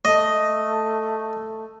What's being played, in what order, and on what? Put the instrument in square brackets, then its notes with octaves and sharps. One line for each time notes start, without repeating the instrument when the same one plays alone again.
[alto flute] A3 [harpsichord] D#5